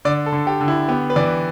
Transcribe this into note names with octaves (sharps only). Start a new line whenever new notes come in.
D3 D5
A4
D3
G4
D3
E4
B3 G4
B4
E3 D5